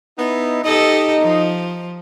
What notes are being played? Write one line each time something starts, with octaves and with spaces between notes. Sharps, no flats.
B3 D#4 E4
D#4 G4 A4 D#5
F3